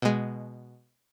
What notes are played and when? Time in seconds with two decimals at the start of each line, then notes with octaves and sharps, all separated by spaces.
0.02 B2 G#3